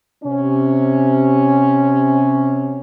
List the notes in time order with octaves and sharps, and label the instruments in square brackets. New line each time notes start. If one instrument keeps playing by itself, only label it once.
[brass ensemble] C3 C#4